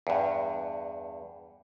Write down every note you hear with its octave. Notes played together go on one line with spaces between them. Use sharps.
E2 G2